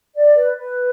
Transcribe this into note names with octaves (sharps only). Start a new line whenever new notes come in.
D5
B4
B4